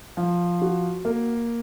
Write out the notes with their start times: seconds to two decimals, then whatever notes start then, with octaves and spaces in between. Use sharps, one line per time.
0.17 F3
0.61 F#4
1.05 A#3